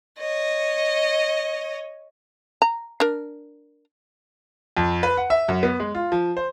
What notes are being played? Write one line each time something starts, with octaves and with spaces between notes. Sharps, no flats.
C#5 D#5
A#5
D4 A#4
F2
B4
F#5
E5
F#2
B3
G#3
F4
F3
C5